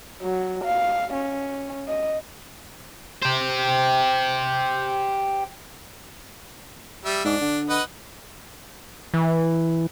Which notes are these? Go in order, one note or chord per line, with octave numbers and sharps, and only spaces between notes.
F#3
F5
C#4
D#5
G4 C5
G3 E5
G#2 D4
D3
B4 D#5 F#5
E3